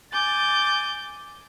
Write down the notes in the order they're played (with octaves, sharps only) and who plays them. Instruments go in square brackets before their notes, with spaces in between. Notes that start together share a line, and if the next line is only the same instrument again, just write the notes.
[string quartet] G#5 D6 G6 A6